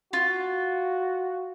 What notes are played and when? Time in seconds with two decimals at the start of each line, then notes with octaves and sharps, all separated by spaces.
0.13 F4 F#4